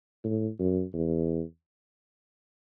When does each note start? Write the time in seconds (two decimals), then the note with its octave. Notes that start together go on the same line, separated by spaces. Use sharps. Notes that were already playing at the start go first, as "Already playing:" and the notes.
0.24 A2
0.59 F#2
0.93 E2